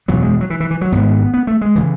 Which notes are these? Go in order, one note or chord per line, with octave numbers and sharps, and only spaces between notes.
F#1 E2 B2 F#3
G#3
F#3
E3
E3
E3
F#3
G#1 G#2 B3
B3
A3
G#3
C#3 E3